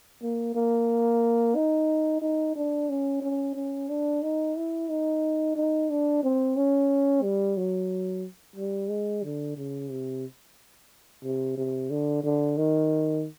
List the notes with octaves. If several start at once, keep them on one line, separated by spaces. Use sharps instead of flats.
A#3
A#3
D#4
D#4
D4
C#4
C#4
C#4
D4
D#4
E4
D#4
D#4
D4
C4
C#4
G3
F#3
G3
G#3
D3
C#3
C3
C3
C3
D3
D3
D#3